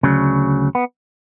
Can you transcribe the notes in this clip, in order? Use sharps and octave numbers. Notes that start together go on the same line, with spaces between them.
D2 C#3 F#3
B3